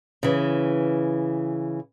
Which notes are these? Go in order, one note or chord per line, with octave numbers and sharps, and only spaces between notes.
C#3 E3